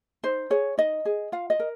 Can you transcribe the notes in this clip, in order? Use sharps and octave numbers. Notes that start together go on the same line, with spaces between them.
D#4 C5
G#4 C#5
D#4 D#5
G#4
F4 F5
D#5
A#4